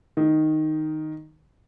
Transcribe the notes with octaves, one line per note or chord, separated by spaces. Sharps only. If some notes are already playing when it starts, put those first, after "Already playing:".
D#3